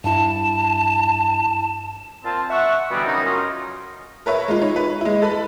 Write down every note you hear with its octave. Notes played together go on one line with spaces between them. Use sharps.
G2 E4 A5
A#2 C4 F4 A5
E5 F#5 C#6
B2 D3 E3 G3 B3 C4
F#2 C#3 C#4 D#4
F#2 C#4 F4 D#5
A#4 B4 C#5 E5
G#3 F4
D#4 C#5
B4
G#3 E4
A4 B4 B5